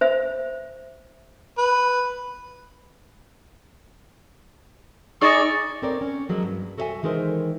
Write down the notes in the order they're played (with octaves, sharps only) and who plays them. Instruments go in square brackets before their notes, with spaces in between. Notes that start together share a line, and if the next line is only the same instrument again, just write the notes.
[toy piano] C5 E5
[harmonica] B4
[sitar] D#4 G#4 D5 [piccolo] C#6 [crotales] D#6 A6 A#6
[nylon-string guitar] C4 A4 A#4 C#5 D5
C#4
F3 F#3 G#3 A#3
G2
F#4 A4 C5 D#5 E5 G#5
D#3 E3 G#3 D#4 A#4 C5